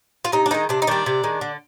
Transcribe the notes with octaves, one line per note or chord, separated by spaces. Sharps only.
F4
C3 D#4
D4
D#3 G#3 D#4
C3 D4
D#4
D#3 G3 D4
C3
D#3 G#3
D3